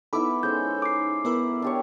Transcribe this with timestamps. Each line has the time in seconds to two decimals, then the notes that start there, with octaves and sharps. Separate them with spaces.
0.13 B3 D#4 E4 A4 E5 B5 D6
0.43 G#3 C#4 C5 G6
0.82 D6 C7
1.25 B3 E4 A#4 B4 E5 F#5
1.62 D4 G4 C#5